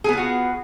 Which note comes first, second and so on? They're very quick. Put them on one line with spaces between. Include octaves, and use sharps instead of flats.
G#4 B3 F4 F#4